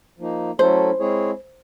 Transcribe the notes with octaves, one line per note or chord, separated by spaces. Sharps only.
F3 A#3 D#4
F#3 A3 C#4 E4 A4 C5
G#3 C4 E4 G#4 C#5